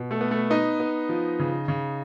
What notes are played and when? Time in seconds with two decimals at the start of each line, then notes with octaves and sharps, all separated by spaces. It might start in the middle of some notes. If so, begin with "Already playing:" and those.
Already playing: B2
0.11 A3 A4
0.21 B3
0.31 A3 A4
0.50 B3 D#4 D#5
0.80 B3
1.09 F3
1.40 C#3
1.68 C#3